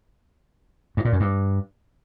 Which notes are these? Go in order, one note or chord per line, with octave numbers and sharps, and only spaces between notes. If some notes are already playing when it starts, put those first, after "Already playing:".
G2
A#2
F#2
G2